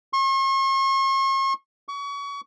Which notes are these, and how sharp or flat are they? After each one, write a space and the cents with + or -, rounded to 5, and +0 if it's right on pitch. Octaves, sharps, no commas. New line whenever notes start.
C#6 -45
C#6 +30